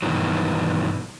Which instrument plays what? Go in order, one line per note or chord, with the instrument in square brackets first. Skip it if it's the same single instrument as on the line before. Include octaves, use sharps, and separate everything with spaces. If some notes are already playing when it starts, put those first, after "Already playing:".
[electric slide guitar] G2 B2 D#3 E3 F#3